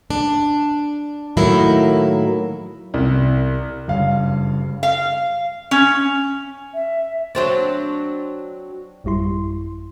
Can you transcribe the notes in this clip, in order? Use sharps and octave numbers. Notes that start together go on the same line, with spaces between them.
D4
A2 D#3 F#3 A#3 E4
C2
F#1 G2 F5
F5
C#4
E5
F#3 C4 D4
A1 F#2 G3 E4 C6